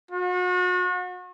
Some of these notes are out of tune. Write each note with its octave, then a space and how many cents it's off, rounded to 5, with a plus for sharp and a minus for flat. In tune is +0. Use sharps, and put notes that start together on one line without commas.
F#4 -40